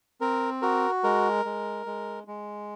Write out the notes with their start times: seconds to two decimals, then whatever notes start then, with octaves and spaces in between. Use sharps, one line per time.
0.21 C4 A#4
0.62 F#4 A#4
1.04 G#3 A#4
1.45 G#3
1.86 G#3
2.27 G#3